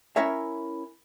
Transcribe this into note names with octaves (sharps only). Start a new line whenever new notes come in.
C#4 E4 A#4 C#5 E5